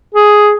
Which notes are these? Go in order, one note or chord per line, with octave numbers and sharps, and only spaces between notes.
G#4